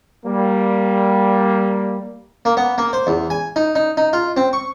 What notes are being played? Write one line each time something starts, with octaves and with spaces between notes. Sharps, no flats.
G3 A#3
A#3
B3
A#3
C5
E2
G#5
D#4
D#4
D#4
F4
C4
C#6